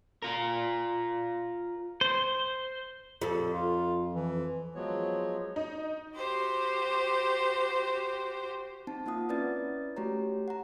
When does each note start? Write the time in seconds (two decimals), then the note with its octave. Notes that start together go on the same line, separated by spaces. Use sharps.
0.22 F4 A#4
2.01 C5
3.22 F2 A4
3.53 F4
4.15 E3
4.75 F3 F#3 G#3 B3 C#5
5.56 D#4
6.16 F#4 G4 C5
8.87 C4 D#4 A5
9.06 A#3 C4 F4 F#5 D#6
9.29 C#4 E4 B4 D5 A6
9.97 A3 F#4 G4 C#5 A#5
10.48 F#5 A#5